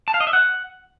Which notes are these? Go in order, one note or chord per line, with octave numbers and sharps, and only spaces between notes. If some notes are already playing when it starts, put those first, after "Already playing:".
A5
F5
D#5
E5
F#5